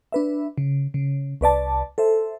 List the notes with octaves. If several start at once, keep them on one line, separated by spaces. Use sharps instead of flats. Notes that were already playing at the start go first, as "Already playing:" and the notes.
D4 B4 E5
C#3
C#3
C2 B4 D5 A5
A4 C5 E5